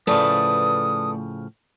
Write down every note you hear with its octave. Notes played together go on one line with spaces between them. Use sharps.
A2 C#3 F3 A3 B4 D5 D#6